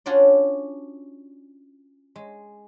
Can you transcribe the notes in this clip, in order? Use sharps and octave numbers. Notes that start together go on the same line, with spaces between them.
C#4 D4 F4 F#4 C#5 D5
G#3